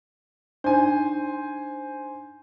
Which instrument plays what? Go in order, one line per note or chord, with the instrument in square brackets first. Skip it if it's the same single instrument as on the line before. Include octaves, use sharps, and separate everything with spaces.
[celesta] D4 D#4 [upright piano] C5 G#5